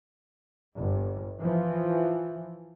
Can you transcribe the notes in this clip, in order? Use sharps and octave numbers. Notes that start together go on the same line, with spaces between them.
G1
E3 F3